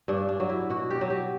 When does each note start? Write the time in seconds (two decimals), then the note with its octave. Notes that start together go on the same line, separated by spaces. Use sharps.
0.08 G2 D4
0.29 D4
0.40 F#3
0.49 E4
0.70 B2 F#4
0.90 G4
1.01 F#3
1.10 G4